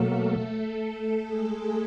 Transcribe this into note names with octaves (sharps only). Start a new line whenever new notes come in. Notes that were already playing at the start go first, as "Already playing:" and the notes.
Already playing: B2 F#3 A3 A#3 A4
A3 A4
A3 A4
G#3 G#4